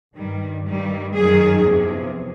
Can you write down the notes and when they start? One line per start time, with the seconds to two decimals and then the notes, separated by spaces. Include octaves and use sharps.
0.16 G2 D#3 G3
0.66 G2 D#3 G3
1.16 F#2 D#3 F#3 G#4
1.66 E2 C3 F3